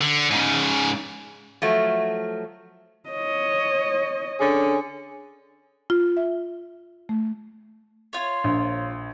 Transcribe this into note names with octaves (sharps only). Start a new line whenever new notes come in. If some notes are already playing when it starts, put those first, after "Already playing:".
D3
G#2 C#3
F3 F#3 A3
C#5 D#5
D3 C#4 G#4
F4
E5
A3
F4 C#5
A#1